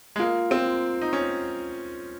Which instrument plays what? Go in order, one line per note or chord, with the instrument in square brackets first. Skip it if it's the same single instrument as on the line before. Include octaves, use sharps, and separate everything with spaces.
[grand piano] G#3
[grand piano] A#3 [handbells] F4
[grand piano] C4
[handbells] F4
[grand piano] D#4
[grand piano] C#4 [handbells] F4